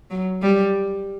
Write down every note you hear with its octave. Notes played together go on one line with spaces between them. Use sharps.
F#3
G3